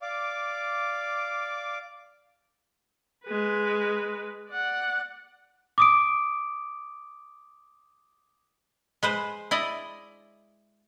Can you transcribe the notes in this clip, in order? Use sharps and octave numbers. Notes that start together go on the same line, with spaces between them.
D5 F5 D6
G#3 B4
D5 F#5
D6 D#6 D7
G#3 B4 C5
E4 D5 D#5